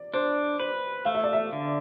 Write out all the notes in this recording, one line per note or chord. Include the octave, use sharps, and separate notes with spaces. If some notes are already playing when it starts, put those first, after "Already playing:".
Already playing: D5
D4 C5
B4 C5
A3 F5
E5
D5
E5
D3